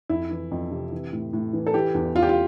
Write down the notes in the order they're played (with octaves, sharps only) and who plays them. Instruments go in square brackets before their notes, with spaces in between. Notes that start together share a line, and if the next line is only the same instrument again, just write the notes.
[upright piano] F2 E4
E3
F2
C3
E3
A2
A2
E3
A4
E3 G4
E2
E2 F4
G4
F4